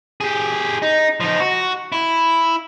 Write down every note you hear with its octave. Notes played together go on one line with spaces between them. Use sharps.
G4 G#4
D#4
F3 D#4
F#4
E4